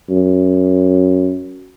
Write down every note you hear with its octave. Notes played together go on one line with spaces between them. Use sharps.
F#2